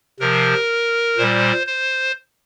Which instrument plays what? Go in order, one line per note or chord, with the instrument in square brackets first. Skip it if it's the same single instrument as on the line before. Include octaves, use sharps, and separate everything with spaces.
[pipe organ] C3 F3 A#4
A#2 G3 C5
C5